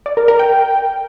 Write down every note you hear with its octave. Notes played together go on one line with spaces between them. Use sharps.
D5
A#4
A#4
G5